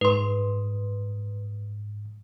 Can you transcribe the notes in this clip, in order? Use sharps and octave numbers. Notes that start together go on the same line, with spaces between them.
G#2 B4 C6 D#6